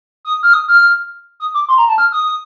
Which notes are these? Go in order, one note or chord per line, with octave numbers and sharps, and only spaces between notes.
D#6
F6
D#6
F6
D#6
D6
C6
A#5
A5
F6
D#6